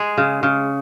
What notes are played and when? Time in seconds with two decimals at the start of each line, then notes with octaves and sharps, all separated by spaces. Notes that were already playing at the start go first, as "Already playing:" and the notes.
Already playing: G#3 G#4
0.18 C#3
0.43 C#3